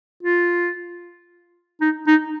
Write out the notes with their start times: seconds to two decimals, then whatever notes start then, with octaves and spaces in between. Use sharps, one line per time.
0.23 F4
1.81 D#4
2.07 D#4